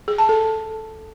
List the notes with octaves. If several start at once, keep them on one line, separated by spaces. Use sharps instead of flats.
G#4
A5
A4